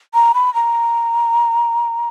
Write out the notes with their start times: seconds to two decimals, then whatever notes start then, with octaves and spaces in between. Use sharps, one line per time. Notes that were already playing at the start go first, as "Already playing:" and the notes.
0.14 A#5
0.34 B5
0.54 A#5